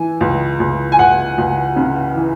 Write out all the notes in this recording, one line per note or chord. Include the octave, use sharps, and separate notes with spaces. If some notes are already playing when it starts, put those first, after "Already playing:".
Already playing: E3 G#5
C#2
C#2
G#5
C#2 F#5
C#2
C#3
E3